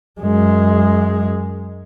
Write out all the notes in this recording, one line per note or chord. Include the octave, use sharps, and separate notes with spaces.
F#2 G#3